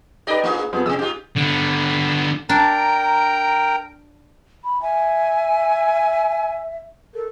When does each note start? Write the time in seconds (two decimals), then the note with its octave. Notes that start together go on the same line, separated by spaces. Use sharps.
0.27 D#4 G4 B4 D5 D#5
0.43 A#3 F4 G#4
0.73 F2 G3 B3 G#4
0.86 C3 F#3 D#6 E6
0.99 G#2 F4 G4
1.36 D3 B3
2.49 D4 A#4 G5 A#5
4.64 B5
4.82 E5 G#5
7.14 A4 A#4